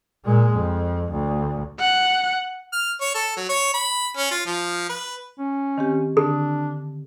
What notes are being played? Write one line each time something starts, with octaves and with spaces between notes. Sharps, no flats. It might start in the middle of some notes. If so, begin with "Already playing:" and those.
A#2 G#3
F2
D2
F#5
F6
C#5
A4
F#3
C#5
B5
C#4
F4
F3
B4
C#4
D#3 C4 G4
D3 D4 A4